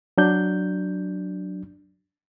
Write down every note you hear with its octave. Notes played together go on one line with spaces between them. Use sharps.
F#3 D4 G6